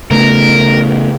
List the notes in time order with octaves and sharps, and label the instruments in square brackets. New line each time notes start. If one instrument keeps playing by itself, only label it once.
[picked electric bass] C#3 A3 B3 [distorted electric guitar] A#4